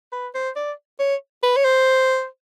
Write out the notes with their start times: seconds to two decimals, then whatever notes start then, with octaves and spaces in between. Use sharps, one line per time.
0.12 B4
0.34 C5
0.56 D5
1.00 C#5
1.43 B4
1.57 C#5
1.65 C5